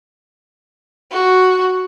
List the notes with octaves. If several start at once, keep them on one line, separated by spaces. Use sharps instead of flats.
F#4